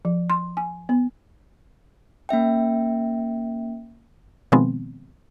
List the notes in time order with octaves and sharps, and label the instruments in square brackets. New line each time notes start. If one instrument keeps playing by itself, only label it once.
[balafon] F3
C6
G#5
B3
[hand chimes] A#3 C#4 E5 G5
[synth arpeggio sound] B2 D#3 F3 G#3 B3 C4